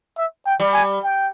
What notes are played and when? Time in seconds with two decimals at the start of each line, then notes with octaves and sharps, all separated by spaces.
0.17 E5
0.46 G5
0.60 G3
0.73 G#5
1.03 G5